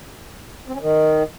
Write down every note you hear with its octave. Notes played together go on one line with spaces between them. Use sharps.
C4
C#4
D#3